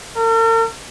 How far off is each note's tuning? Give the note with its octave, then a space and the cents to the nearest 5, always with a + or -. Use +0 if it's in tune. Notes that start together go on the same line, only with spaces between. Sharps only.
A#4 -45